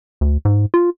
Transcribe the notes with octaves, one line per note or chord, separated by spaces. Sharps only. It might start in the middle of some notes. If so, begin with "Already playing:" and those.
D2
G#2
F4